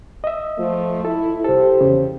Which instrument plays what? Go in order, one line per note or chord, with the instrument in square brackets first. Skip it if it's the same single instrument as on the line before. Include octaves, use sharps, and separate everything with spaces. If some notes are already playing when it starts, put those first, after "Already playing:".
[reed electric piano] D#5 E5
[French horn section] F3 A3
[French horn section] E4 [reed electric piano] A4
[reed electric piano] C2 A4 [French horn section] G4 C5
[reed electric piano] E2 C#3